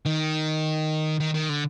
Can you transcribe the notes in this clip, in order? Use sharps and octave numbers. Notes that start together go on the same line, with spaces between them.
D#3
D#3
D#3
D3